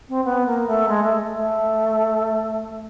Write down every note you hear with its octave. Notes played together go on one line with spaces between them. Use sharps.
C4
B3
A#3
A3
G#3
A3
A3